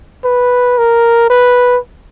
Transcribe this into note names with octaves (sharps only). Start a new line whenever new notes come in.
B4
A#4
B4